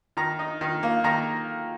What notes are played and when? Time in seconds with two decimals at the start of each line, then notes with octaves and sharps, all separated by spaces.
0.17 D#3 A#5
0.39 D#4
0.61 D#3
0.83 A#3
1.04 D#3 A#5